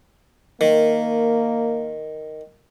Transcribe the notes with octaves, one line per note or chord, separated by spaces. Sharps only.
D#3 A#3